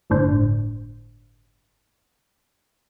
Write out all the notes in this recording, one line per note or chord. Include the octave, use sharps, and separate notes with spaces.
G1 A2 D4 C5